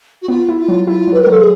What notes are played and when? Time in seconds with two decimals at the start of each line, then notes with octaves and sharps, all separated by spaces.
0.21 F#4
0.28 B3 F4
0.49 E4
0.59 F4
0.68 F#3
0.87 E4 F4
1.07 F#3
1.13 B4
1.21 A#4
1.27 F#3 A4
1.39 G#4